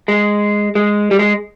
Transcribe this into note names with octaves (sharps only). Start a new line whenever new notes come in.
G#3
G#3
G3
G#3